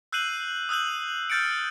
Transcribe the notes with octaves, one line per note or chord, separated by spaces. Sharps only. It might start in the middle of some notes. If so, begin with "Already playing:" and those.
E6 F#6 G6 C7 D#7 F#7
D#6 E6 F#6 G6 F#7
F6 G6 A6 C#7 D7